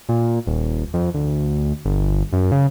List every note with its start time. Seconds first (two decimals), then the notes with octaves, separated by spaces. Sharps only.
0.09 A#2
0.47 D#1
0.94 F2
1.14 D2
1.85 G1
2.33 F#2
2.52 C#3